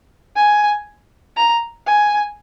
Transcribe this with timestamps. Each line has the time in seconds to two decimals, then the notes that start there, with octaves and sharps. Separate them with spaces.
0.36 G#5
1.37 A#5
1.87 G#5